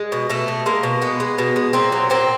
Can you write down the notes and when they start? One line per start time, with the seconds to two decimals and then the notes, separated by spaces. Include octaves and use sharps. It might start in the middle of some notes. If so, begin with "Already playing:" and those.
Already playing: G#3
0.12 B2
0.30 B2 A3
0.48 B2
0.66 G#3 A#3
0.83 B2
1.02 G#3 B3
1.20 G#3
1.38 B2
1.56 G#3
1.73 A#2 C4
1.92 F#3
2.10 A#2 C4